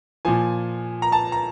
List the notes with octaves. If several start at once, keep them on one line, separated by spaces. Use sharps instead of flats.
A#2 F3 G#5
A#5
A5
A#5